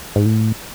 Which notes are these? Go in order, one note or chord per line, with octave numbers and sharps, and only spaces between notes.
G#2
A2